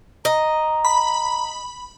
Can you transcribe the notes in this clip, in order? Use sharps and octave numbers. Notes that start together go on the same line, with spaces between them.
D#5 A#5
B5